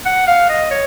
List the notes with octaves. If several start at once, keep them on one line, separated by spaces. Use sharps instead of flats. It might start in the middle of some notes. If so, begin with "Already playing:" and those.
F#5
F5
D#5
C#5